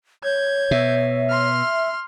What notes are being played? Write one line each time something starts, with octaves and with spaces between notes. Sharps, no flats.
C#5 G6 G#6
B2 E5
C6 F6